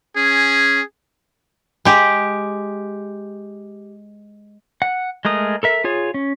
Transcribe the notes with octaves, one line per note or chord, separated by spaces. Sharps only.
C#4 G#4
G#3 G4
F#5
G#3 A3 A#4 D#6
A4 A#4 E5
F4 G#4 C#5
C#4